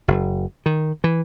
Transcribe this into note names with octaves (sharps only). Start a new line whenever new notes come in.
F#1
D#3
E3